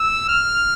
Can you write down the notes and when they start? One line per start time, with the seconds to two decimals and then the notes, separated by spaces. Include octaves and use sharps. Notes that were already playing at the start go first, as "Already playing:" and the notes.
Already playing: E6
0.29 F6